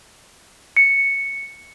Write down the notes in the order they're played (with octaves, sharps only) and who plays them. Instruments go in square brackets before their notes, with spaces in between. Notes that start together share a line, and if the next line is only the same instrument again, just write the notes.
[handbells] C#7